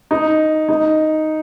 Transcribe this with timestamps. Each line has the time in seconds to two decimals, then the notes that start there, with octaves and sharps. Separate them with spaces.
0.11 D#4
0.69 D#4